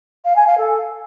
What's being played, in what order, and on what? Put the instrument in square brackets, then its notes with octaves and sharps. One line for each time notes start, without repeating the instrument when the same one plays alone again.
[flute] F5
G#5
F5
A4